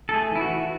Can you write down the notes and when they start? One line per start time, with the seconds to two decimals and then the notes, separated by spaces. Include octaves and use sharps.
0.09 A4
0.13 A3 G#4
0.31 E3 E4
0.41 F#4
0.50 E3